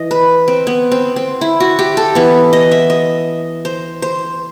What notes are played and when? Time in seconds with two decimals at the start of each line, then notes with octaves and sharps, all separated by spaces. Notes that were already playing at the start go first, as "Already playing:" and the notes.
Already playing: E3 D#5
0.11 B4
0.48 C4
0.67 B3
0.92 C4
1.16 C4
1.41 E4
1.60 F#4
1.79 G4
1.97 A4
2.15 E3 B3
2.53 D#5
2.71 E5
2.90 D#5
3.65 C5
4.02 C5